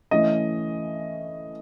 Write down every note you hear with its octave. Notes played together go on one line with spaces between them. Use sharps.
E3 A3 C#4 D#5